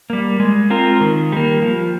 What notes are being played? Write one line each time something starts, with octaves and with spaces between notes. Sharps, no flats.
G3 A#3
G#3
C4 F4 A#4
D#3
G3 A#3
F3